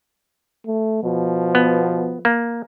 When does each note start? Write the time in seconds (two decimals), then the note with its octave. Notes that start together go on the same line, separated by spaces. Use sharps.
0.67 A3
1.04 B2 F3
1.55 B3
2.25 A#3